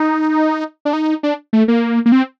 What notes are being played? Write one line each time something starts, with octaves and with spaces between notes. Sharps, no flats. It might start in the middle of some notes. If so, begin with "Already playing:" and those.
Already playing: D#4
D4
D#4
D4
A3
A#3
A#3
C4